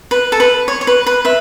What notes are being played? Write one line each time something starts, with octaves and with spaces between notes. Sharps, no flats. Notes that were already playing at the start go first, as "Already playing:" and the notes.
B4
A4
B4
C#5
C#5
B4
B4
B4 E5